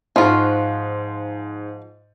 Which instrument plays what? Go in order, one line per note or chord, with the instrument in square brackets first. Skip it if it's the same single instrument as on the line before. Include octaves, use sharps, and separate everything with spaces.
[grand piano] G#2 [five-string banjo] F3 F4 F#4